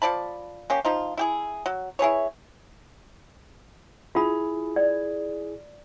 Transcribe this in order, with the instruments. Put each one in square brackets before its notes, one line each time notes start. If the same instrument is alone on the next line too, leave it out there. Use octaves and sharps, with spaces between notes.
[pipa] F3 D5 A5 B5
A#3 C#4 G4
F3 D#4 F4
E4 G4 G#4
F#3
E4 G#4 B4 C#5
[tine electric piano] E4 G#4 [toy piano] F4 B5
[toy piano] D5